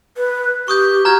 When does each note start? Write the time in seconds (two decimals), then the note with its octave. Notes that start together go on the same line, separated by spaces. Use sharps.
0.17 B4
0.68 G4 C#6 D#6 G6
1.05 F#4 A#5 F6 G#6